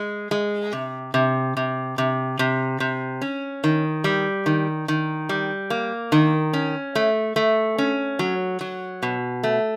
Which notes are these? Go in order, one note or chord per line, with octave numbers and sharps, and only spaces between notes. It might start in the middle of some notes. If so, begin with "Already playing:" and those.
Already playing: G#3
G#3
C3
C3
C3
C3
C3
C3
C#4
D#3
G3
D#3
D#3
G3
A#3
D#3
C#4
A3
A3
C#4
F#3
F#3
B2
A3